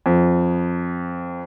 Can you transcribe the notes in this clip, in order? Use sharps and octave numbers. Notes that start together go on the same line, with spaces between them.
F2